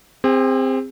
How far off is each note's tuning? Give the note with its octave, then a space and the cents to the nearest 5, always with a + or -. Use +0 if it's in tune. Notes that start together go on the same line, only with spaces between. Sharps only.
C4 +0 G#4 -40